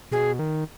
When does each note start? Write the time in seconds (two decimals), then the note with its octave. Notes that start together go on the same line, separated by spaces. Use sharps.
0.11 B2 G#4
0.39 D#3